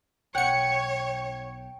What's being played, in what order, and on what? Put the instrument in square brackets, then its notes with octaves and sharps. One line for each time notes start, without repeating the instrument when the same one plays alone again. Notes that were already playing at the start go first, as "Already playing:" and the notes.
[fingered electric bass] B1 B2 [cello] C#5 [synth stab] F#5 C#7 [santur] G5